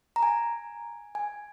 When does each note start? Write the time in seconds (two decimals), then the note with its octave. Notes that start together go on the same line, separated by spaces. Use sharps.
0.16 A#5
0.23 G#5
1.15 G#5